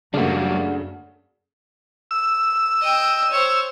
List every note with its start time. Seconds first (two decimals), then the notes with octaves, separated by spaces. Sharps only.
0.14 F#2 C#3 F#3 G3 A3 A#3 D4 F#4
2.11 E6
2.82 D#5 G5
3.31 C5 C#5